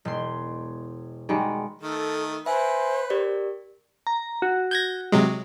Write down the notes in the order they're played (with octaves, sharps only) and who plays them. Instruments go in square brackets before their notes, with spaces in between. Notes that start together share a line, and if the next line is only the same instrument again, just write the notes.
[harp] E1 C6
[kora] D#3 G3 G#3 [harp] F#4
[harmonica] D#3 A3 [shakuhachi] A4
[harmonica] B4 [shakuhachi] C5 [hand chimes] E5 G#5
[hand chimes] G4 A#4 D5
[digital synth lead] A#5
F#4
[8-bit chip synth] G6 G#6 A#6
C3 F#3 G#3